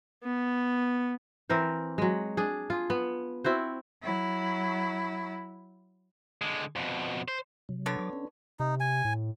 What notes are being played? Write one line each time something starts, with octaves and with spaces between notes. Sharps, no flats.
B3
E3 C4 A#4 C5
F#3 G#3
D4 G#4
F4 G#4
B3
C4 E4 F#4 C5
F#3 E4
D3 G#3
F2 B2
C5
C3 F#3
D3 B3 C#5
F#3 D6
C#4
C3 D#4
G#5
A2